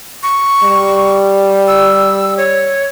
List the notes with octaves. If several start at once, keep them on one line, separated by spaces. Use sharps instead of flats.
C#6
G3
E6
C#5